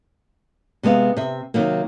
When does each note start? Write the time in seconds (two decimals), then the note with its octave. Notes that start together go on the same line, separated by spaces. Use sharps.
0.83 C3 G#3 B3 F5
1.17 C3 E5
1.54 C3 D#3 F#3 A#3